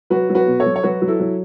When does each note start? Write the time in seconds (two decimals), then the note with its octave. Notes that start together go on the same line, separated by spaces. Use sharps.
0.10 F#3 F#4 B4
0.29 F#3
0.35 F#4 B4
0.46 B2
0.60 A4 C#5
0.66 F#3
0.76 C#5
0.83 F#3 F#4 B4
1.02 F#3
1.08 E4 A4
1.20 F#3